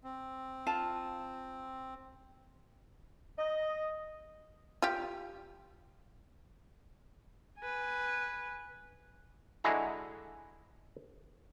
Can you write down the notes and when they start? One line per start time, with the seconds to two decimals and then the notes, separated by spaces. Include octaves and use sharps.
0.04 C4
0.67 F4 F5 A5
3.38 D#5
4.82 F4 G4
7.60 B4 G#5
9.64 D3 G#3 E4 F#4 G#4 A#5